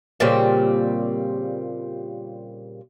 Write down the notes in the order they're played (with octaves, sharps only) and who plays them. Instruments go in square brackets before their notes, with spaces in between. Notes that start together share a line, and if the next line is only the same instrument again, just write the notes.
[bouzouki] A#2 C#3 G3 C4